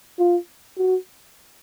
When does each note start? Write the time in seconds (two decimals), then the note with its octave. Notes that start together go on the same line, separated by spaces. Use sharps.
0.19 F4
0.78 F#4